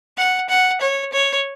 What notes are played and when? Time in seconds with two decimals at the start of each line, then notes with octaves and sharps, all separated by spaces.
0.17 F#5
0.49 F#5
0.81 C#5
1.13 C#5